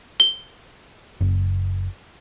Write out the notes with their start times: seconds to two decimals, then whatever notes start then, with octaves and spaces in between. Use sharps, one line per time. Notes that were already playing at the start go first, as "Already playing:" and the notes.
0.20 G7
1.21 F#1